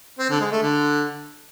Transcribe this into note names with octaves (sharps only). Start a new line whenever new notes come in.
C4
D3
G#3
A3
D3